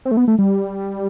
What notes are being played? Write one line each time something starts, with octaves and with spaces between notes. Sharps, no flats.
C4
A3
B3
A3
G3